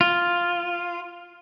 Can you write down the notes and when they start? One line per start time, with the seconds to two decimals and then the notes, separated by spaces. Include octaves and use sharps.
0.01 F4